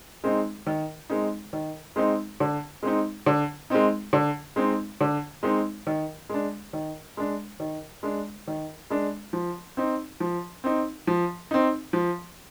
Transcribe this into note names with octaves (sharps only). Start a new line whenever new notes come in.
G#3 C4 D#4
D#3
G#3 C4 D#4
D#3
G#3 C4 D#4
D3
G#3 C4 D#4
D3
G#3 C4 D#4
D3
G#3 C4 D#4
D3
G#3 C4 D#4
D#3
G#3 D4
D#3
G#3 D4
D#3
G#3 D4
D#3
G#3 D4
F3
C4 D#4
F3
C4 D#4
F3
C4 D#4
F3